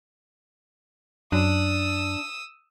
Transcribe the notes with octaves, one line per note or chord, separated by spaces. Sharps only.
F#2 D4 D#6 E6